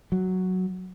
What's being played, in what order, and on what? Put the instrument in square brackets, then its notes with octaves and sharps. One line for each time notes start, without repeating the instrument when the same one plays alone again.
[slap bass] F#3